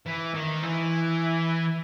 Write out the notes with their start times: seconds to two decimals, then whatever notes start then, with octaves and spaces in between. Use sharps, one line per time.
0.06 E3
0.34 D#3
0.63 E3